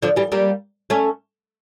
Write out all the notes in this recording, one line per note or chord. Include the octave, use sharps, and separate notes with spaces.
D3 F3
E3 G3
G3 A#3
A3 C#4